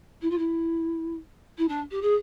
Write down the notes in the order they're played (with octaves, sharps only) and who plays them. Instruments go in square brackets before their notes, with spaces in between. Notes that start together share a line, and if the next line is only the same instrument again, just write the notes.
[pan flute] E4
F4
E4
E4
D4
G4
G#4